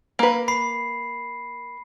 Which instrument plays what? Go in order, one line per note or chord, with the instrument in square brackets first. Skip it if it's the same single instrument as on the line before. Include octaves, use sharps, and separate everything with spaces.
[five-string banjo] A#3 B4
[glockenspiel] B5 C7